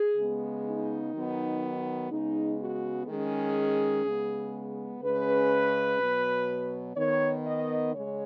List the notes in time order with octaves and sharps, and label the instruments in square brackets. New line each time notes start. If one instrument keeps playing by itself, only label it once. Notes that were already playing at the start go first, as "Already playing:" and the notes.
Already playing: [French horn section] G#4
C#3 G#3 B3
D#4
D#3 F#3 B3
C#3 G#3 B3 D#4
F#4
D#3 G#3 C#4 G#4
C#3 G#3 B3
C#3 G#3 C#4 B4
B2 F#3 B3
D#3 B3 C#5
D#5
C#3 G#3 C#4 C#5